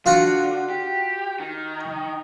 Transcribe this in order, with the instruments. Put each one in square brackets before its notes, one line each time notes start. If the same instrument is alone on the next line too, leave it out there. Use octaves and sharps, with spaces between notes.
[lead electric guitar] D3 [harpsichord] F4 F#4 F#5
[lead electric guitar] G4
D#3